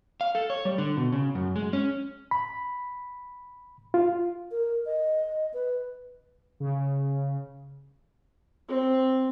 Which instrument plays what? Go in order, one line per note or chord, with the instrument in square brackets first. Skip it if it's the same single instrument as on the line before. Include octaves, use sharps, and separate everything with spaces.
[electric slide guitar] F5
A4
C#5
G3
D3
B2
C#3
F#2
G#3
C#4
[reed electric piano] B5
F4
[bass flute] A#4
D#5
B4
[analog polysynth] C#3
[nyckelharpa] C4